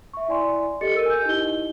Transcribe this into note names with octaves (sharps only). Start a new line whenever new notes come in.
E5 C#6
E4 D5 G#5 C6
G4 A4 D#5 A6 C#7
A#4 E6 D#7
G#5 G6
D#4 E4 G4 D#5 G7